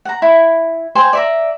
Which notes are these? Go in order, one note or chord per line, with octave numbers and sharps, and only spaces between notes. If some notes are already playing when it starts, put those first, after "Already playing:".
F#5 A#5
E4
C5 G5 G#5
D5 E5 A#5